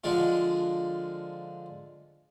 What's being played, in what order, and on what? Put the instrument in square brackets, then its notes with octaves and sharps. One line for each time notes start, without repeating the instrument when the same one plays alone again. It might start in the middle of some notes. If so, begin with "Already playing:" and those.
[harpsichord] D3 F3 G#3 D4 F4